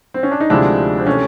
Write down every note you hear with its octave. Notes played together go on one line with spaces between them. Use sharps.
C4
C#4
D4
D#4
D2 C3 F3 G#3 D4 E4
C4
C3 E3 A3 C#4